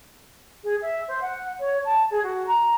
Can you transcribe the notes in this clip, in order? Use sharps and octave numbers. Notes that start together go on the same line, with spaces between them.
G#4
E5
C5
F#5
C#5
A5
G#4
F#4
A#5